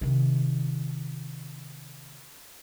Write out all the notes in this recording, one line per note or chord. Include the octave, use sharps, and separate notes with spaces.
C3 D#3